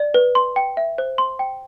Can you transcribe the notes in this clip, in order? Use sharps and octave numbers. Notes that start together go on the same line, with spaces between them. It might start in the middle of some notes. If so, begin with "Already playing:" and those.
Already playing: D5
B4
C6
G5
E5
C5
C6
G5